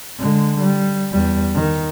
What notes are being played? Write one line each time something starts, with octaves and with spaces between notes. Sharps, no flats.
D3 G#3
G3
E2 G3
D#3